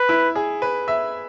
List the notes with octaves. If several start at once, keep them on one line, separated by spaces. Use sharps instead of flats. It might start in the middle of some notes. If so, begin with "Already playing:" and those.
Already playing: B4
E4
G#4
B4
E5